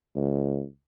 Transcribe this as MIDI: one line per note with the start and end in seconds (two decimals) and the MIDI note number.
0.16 0.64 37